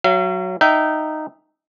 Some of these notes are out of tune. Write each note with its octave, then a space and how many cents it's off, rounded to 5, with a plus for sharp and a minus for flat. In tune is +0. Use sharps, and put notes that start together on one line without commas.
F#3 +0 F5 -45
D#4 -10 E5 +0 G5 -25